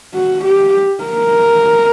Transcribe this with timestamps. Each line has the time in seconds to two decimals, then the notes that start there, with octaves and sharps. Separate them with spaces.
0.15 F#4
0.44 G4
1.04 A#4